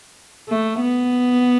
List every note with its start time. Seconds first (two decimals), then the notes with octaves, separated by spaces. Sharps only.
0.49 A3
0.81 B3